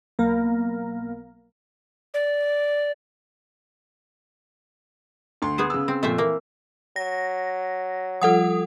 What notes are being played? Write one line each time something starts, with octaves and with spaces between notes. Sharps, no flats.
B1 A#3 A#4
D5
D2 C6
B3 G#4 C5
C#3 E6
C4
F2 A#2 A3 C5 E5
E3 A#3
F#3 A#6
F3 G3 F4 A4 F#5 D#6